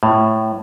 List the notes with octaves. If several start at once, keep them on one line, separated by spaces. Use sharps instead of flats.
A2